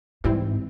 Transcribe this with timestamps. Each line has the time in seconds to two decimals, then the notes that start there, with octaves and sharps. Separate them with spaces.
0.24 G#2 E3 G3 C4 E4